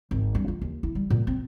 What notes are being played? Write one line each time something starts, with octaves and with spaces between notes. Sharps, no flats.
G#1
G2
F4
D#2
E4
G3
A#2
C4